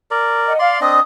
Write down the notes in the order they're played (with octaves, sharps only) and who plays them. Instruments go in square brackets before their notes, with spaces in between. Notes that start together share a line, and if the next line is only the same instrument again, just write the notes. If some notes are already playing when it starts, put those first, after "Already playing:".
[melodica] A#4 D5
[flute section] D#5 F#5
[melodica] D5 C6 [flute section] F5
[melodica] C4 D4 D#5 [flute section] D#6